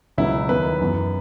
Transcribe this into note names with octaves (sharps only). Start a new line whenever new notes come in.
C#2 B2 F#3 B3 E4
D#2 D#3 F#3 B3 B4
F#2 E3 B3